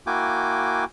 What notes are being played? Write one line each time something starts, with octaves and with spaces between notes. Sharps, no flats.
A#3 E4 F#4 G5 G#5 D6